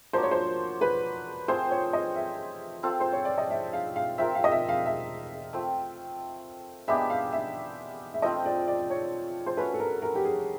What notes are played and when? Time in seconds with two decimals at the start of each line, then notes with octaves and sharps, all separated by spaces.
0.13 F3 A#3 D4 F#4 C5
0.23 C#5
0.31 C5
0.81 B4
1.48 A3 C4 F4 G#4 C5
1.71 C#5
1.93 D#5
2.16 E5
2.83 C4 F4 A4
3.00 C5
3.13 C#5
3.25 D5
3.38 D#5
3.50 E5
3.73 F5
3.96 F5
4.18 C4 F4 A#4 E5
4.35 F5
4.44 D#5
4.51 E5
4.69 F5
4.86 E5
5.53 A3 C4 F4
6.88 G#3 B3 D4 G4 E5
7.10 F5
7.32 E5
8.14 E5
8.22 F3 A3 C4 F4 D#5
8.45 D5
8.68 D5
8.90 C#5
9.46 C5
9.57 A3 C#4 F#4 B4
9.74 A4
9.80 A#4
10.02 A#4
10.15 G4
10.25 G#4